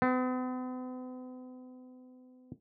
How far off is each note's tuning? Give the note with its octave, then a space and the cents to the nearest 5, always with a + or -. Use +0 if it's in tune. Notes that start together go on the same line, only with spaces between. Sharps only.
B3 +45